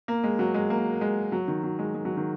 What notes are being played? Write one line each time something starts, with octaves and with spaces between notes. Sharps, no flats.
A#3
G#3
F#3
G#3
A#3
G#3
F#3
D#3
F#3
G#3
G#3
F#3
D#3